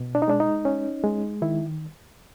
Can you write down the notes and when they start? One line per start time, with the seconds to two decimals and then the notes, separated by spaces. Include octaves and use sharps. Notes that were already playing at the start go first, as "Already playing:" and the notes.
Already playing: B2
0.15 D4
0.22 D#4
0.28 G#3 D4
0.40 D#4
0.65 C#4
1.04 G#3
1.42 D#3 E4